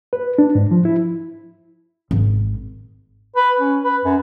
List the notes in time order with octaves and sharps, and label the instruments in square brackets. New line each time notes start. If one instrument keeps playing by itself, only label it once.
[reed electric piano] B4
D4
G#2
F3
E4
[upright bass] G#1
[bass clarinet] B4
C#4
B4
F#2